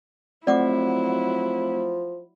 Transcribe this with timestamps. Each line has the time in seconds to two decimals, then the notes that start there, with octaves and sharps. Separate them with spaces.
0.47 F3 F#3 A3 C4 E4 D5 F#5 D6